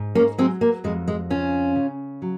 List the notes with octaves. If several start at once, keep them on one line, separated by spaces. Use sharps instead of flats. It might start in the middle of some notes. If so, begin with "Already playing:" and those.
Already playing: G#2
A#3 C#4
F#3 G#3 C4
A#3
F2 G#3
G#3
C#3 C#4 F4
C#3
F#3